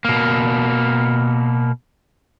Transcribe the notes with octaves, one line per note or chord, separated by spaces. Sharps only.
B2 A#3